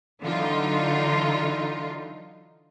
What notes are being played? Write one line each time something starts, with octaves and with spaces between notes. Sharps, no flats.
D3 E3 F#3 D#4 F4